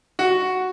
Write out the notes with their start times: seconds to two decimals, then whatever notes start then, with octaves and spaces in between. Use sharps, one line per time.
0.19 F#4